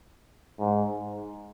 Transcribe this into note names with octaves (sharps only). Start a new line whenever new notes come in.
G#2